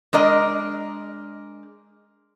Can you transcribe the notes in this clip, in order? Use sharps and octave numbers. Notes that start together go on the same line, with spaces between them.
G#3 D4 A#4 D#5